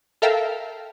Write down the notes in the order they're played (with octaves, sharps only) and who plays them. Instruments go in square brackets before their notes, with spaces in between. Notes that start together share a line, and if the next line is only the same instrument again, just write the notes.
[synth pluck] A4 A#4 E5 F5 G5 A#5